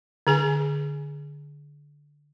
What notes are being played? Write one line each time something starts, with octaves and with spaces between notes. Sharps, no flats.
D3 G#4 G#5